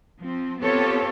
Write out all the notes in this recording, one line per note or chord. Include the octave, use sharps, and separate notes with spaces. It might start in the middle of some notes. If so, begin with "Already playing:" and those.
F3 C4
B3 C4 F4 G4 A4 C#5